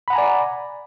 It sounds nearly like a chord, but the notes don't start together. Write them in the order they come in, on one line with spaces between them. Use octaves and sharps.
B5 F#5 A#5 G#5 D5